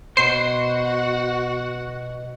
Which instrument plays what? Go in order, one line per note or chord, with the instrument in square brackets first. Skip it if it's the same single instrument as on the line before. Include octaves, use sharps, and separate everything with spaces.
[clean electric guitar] B2 C5 [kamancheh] F#4 F#5 [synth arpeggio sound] C7